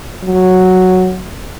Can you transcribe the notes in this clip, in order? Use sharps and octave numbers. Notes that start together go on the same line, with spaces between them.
F#3